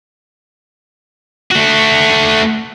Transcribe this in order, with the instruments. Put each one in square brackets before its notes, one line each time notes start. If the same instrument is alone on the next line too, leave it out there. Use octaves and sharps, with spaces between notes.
[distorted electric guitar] A3 F#4